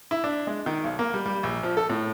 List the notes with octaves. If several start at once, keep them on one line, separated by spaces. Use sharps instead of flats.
E4
D4
G#3
D#3
B1
A#3
G3
G3
A#1
F3
A4
A2